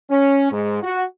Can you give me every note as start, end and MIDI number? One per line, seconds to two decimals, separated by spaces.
0.10 0.50 61
0.52 0.80 44
0.82 1.04 66